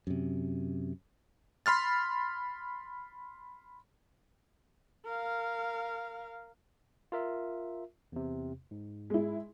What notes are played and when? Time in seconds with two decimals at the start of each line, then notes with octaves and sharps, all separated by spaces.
0.07 F#2 C3
1.66 B5 C6 F6 A6
5.05 A#4 F5
7.12 F4 A#4 E5
8.12 E2 C3
8.71 G#2
9.10 G#3 E4